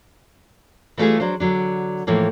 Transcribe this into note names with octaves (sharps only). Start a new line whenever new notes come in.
E3 G3 A3 D#4 F4 G#4
F#3 D4 C5
D3 F#3 D4
A2 E3 F3 A#3